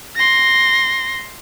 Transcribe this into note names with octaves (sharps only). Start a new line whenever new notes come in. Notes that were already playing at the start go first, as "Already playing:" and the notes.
C6 A#6